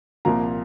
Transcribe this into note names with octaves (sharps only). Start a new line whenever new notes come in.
C2 A#2 F3 A#3 A#5